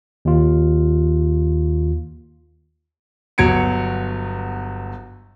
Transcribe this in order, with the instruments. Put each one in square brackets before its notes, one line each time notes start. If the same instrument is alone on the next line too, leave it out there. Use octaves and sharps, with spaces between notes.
[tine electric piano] D#2 F4
[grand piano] G1 B2 F#3 G#6 C#7 D7